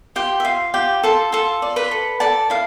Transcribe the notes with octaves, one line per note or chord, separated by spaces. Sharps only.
F4 G4 G5
E5
F4 F5
F4 G4 G5
F4 A4 A5
F4 A4 A5
D5
B4 B5
A4
A4 D5 A5
E4 F5